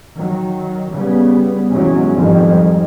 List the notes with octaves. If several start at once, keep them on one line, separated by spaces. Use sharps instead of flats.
D#3 F#3
C#3 G3 B3
E2 G#2 C3 F#3 G#3 C#4
F2 G#2 D#3 G3